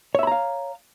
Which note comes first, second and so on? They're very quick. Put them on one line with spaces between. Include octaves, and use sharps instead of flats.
C#5 E5 B5 A#5 F5